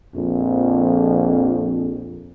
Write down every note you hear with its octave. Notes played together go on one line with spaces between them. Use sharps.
A#1 F2